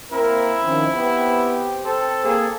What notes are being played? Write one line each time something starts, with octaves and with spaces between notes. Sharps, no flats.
A#3 C4 E4 A#4
D#3 F3 C#4
B3 C4 G4
A4 C5
A#3 G#4